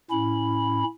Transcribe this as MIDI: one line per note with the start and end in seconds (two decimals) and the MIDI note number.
0.11 0.83 45
0.11 0.83 61
0.11 0.83 64
0.11 0.83 83